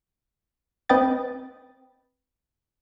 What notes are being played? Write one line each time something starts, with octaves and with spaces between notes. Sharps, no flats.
C4 B4 D#5 G5 A6